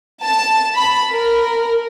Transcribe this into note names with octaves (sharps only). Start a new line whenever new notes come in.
A5
B5
A#4